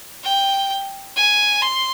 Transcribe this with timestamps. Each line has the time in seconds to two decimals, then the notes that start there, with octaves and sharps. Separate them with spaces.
0.24 G5
1.16 G#5
1.62 C6